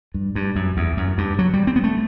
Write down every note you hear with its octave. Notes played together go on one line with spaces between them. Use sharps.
G2
G2
F#2
E2
F#2
G2
F#3
G3
C4
B3
A3